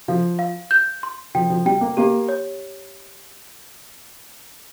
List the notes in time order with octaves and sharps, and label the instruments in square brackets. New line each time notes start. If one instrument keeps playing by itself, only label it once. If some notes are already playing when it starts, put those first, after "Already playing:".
[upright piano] F3 [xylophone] F5
[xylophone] F5
G6
C6
[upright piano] F3 [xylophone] G5
[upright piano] F3
[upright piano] G3 [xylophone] G5
[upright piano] A#3
[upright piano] A#3 [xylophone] G4
[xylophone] C#5